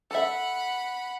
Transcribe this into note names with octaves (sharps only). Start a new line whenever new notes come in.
A4 E5 F#5 B5